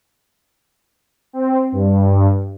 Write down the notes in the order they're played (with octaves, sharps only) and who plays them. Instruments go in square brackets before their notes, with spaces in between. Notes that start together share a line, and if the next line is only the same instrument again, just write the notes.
[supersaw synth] C4
G2